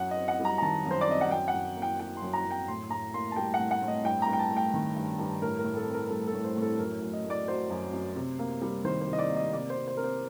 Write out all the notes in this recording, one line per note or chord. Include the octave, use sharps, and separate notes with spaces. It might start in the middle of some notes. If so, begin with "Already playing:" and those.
Already playing: F#2 F#5
D#5
C4
F#5
G3
A#5
A#5
D#3 A5
F#2
C5
D5
C4 D#5
F#5
F#2 G5
F#5
F#2
A#3
G5
F#3 G5
C6
F#2
A#5
F#2
G5
A2 C6
A2 A#5
A#3 C6
A5
G3 G5
F#5
A2
F#5
A2
D#5
G2 G5
A#5
G2
G5
A5
A3
G5
D#3
G2
G2
A2 A#4
A#4
A2
A4
C4
A#4
A#4
G3 A4
A4
A2
C5
A2
A4
F#2 A#4
F#2
D#5
A3
D5
F#3 C5
F#2
F#2
C3
A#3
G3
D#3 C5
C5
C3
D#5
D5
A#3
D#5
C3 D5
C5
C3
C5
C4 A#4
C5